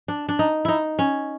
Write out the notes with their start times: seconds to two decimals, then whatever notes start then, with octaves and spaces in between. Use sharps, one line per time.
0.08 D4
0.29 D4
0.39 D#4
0.65 D#4 E4
0.99 C#4